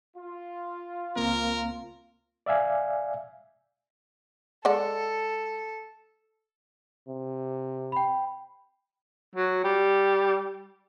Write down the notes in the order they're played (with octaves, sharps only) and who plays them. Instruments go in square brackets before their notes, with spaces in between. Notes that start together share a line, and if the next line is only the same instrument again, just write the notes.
[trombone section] F4
[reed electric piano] C#2 A#3 C4 [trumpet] A#4
[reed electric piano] D5 E5 F5 G#5
[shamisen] G#3 D5 F#5 [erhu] A4
[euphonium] C3
[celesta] G5 B5
[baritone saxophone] F#3
G3